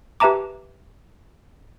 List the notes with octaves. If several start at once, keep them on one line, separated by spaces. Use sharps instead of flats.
G4 B4 E5 A5 A#5 D6